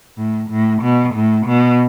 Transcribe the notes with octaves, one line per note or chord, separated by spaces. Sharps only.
A2
A2
B2
A2
B2